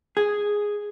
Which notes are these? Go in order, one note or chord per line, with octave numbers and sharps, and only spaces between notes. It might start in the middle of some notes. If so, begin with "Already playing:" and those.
G#4